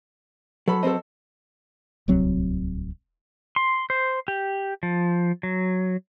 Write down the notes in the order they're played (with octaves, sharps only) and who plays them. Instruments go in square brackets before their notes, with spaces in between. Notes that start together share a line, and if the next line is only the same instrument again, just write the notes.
[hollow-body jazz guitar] F#3 [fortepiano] A4 B5
[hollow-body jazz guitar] F#3 C4 D#5 [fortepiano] A4 C5
[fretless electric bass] D1 C2 F#3 C4
[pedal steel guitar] C6
C5
G4
F3
F#3